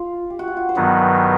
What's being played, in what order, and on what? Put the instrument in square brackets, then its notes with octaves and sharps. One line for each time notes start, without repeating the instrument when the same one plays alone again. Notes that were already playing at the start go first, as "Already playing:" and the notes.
Already playing: [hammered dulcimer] F4
G4
F#4
F4
F#4
C5
[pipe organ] G2 D#3 F#3 B3 [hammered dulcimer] B4
[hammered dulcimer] G#4